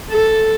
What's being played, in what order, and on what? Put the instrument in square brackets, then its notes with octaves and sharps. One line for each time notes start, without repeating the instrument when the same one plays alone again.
[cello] A4